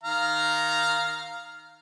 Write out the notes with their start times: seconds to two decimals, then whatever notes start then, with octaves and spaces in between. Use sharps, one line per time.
0.04 D#3 F5 A#5